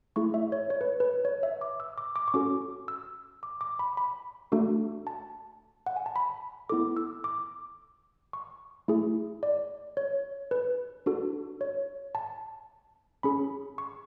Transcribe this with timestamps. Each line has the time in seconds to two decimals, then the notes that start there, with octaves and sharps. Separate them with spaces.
0.16 A3 E4 G#4 C#6
0.34 E5
0.52 C#5
0.70 C#5
0.81 B4
1.00 B4
1.25 C#5
1.43 E5
1.61 D6
1.80 E6
1.98 D6
2.16 D6
2.28 C#6
2.34 C#4 F#4 A4 D6
2.88 E6
3.43 D6
3.61 D6
3.79 B5
3.97 B5
4.52 A3 D4 F#4 A4
5.07 A5
5.86 F#5
5.96 G#5
6.06 A5
6.16 B5
6.69 B3 E4 A4 D6
6.97 E6
7.24 D6
8.33 C#6
8.88 A3 E4 G#4
9.43 D5
9.97 C#5
10.51 B4
11.06 D4 F#4 A4
11.61 C#5
12.15 A5
13.23 C#4 G#4 B5
13.78 C#6